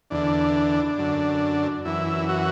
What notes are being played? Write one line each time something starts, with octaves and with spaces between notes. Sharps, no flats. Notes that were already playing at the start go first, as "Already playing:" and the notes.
E2 D3 D4
F#2 D3
F#2 E3 E4
F#4